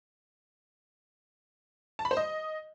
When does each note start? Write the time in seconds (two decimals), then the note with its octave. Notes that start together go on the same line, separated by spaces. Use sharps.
1.99 A5
2.05 B5
2.11 C5
2.17 D#5